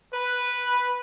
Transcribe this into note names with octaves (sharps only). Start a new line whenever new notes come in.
B4